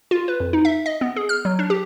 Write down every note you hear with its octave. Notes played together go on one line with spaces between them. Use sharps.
F4
B4
F2
D#4
E5
D#5
B3
G#4
F6
F#3
D4
G4